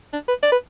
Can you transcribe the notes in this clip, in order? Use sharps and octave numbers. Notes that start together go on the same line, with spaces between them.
D4
B4
D5
B4